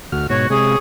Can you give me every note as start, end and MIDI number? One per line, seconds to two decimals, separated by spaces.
0.12 0.27 38
0.12 0.27 66
0.12 0.27 89
0.30 0.47 44
0.30 0.47 47
0.30 0.45 66
0.30 0.46 73
0.50 0.76 48
0.50 0.76 56
0.50 0.78 68
0.50 0.77 73